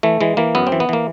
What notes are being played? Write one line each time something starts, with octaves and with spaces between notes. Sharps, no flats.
E3 A3
E3 G#3
E3 A#3
F#2 B3
C4
E3
B3
E3 A#3